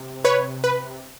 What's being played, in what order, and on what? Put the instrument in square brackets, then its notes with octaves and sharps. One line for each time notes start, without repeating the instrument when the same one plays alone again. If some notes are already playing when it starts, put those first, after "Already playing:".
Already playing: [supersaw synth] C3
B4 C#5
B4